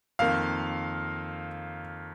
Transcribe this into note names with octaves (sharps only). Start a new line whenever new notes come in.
F2 D#3 A#3 F5